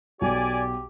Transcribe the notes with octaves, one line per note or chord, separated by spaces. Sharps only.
B1 G4 D5 G#5